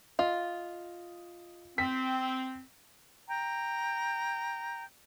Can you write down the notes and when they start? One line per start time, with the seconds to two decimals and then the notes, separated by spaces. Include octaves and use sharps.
0.19 F4 D#5
1.78 C4 B6
3.29 G5 A#5